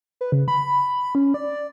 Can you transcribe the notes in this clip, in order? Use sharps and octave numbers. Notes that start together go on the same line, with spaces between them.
B4
C#3
B5
C#4
D5